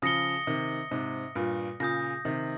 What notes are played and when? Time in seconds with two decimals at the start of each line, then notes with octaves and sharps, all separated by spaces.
0.02 C#3 F3 D#6 A#6 C#7 G7
0.47 C3 D#3
0.91 G#2 C3
1.35 G2 A#2
1.80 A#2 C#3 D#6 G6 A#6
2.25 C3 D#3